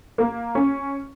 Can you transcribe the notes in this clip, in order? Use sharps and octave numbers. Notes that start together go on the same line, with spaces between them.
A#3
C#4